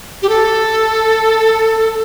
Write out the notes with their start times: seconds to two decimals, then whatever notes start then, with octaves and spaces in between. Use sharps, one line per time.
0.22 G4
0.29 A4